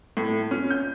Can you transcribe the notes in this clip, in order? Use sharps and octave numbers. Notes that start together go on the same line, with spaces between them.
A2
C#4
G6